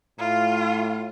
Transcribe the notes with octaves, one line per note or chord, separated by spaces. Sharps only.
A2 F4